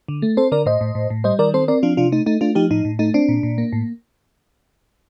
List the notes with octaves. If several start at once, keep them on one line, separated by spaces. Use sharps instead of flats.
D3
A3
C4 A4 C5
D3 A#4 D5
A2 C5 D#5
A2
A2
A2
G3 C5 D#5
D#3 A#4 D5
C4 A4 C5
C4 A#4 D5
F3 D4 F4
C3 D4 F4
A3 D#4
A3 D#4
A3 D4 F4
F3 D#4 G4
A2 D#4
A2
A3 D#4
C4 D4
A#2
A#2
A#3
A2